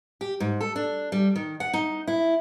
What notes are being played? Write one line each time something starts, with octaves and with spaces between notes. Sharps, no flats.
G4
G#2
A4
D4
G3
D#3
F#5
D#4
E4